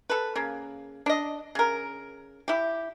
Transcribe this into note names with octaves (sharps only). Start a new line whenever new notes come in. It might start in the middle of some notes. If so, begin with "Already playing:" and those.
A4 B4
C#3 A#3
D4 D#5
C#3 A#4
E4 G4